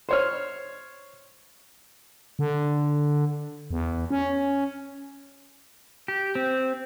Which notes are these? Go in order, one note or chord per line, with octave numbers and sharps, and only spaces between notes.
C5 C#5 F6
D3
E2
C#4
G4
C4